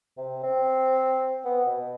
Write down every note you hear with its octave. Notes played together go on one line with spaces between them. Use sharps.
C3
C4
B3
B2